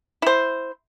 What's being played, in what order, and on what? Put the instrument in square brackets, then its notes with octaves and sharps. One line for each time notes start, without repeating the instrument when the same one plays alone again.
[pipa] E4 C5